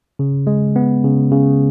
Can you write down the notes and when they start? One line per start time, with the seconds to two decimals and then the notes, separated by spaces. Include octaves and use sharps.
0.19 C#3
0.47 G#3
0.76 B3
1.04 C#3
1.32 C#3